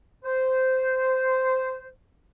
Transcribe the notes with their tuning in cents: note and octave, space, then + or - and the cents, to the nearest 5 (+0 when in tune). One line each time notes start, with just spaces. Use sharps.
C5 -10